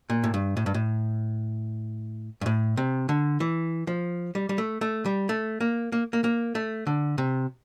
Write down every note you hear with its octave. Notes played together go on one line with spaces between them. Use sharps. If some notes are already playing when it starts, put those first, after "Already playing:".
A#2
A2
G2
A2
G2
A2
G2
A2
C3
D3
E3
F3
G3
G3
A3
A3
G3
A3
A#3
A#3
A#3
A#3
A3
D3
C3